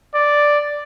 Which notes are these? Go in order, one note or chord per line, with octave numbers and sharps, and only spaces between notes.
D5